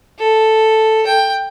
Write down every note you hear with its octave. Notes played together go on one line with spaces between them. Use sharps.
A4
G5